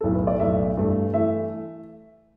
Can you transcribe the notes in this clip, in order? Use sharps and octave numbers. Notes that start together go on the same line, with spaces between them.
B1 A2 A3 A4
B4
D5
B1 A2 A3 E5
G2 E3 A3
E3 A3 E5